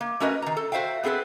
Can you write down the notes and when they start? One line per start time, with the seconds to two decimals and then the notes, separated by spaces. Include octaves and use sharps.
0.01 A#3
0.20 A3 C#4 F#4 A#4 B4 D#5
0.42 D#3 A#5
0.57 A4
0.72 F#4 C5 E5 F5 G5
1.04 B3 C4 G#4 A4 B4